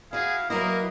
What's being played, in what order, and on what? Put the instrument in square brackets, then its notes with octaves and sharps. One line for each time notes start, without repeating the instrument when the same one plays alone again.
[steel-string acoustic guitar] E4 F#4 [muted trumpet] G#4 [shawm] F5
[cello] F#3 [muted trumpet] A#3 [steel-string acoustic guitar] E4 A#4 B4 [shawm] D#5